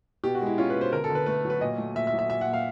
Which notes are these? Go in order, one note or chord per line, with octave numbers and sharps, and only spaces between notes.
B2 G4
F#4
G#3 E4
C#4 F4
B4
B2
C5
D3 A#4
A4
D3
B4
A3 B4
F#3
B4
A#2 D#5
A3
A#2 E5
E5
F#3
E5
A#2 E5
F#5
A#2
F5